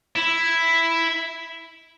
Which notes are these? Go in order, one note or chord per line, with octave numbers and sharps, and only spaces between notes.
E4